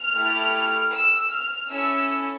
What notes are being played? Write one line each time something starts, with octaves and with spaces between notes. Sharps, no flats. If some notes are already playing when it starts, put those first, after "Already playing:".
Already playing: F6
A3 E4 G4
E6
F6
C#4 E4 A4 E6